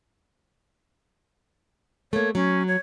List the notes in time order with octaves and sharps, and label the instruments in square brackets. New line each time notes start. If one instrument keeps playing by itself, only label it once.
[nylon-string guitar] A3 A#3 [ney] C#5
[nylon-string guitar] F#3 [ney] C#4
[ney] C#5